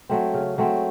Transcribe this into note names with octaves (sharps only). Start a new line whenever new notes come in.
F#3 A3 C4
C#3
F#3 A3 C4